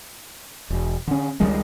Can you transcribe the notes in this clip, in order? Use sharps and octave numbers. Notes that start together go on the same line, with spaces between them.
E1
D3 C#4
C#2 D#3 G3 G#3